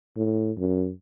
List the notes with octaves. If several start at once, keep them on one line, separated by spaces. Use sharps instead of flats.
A2
F#2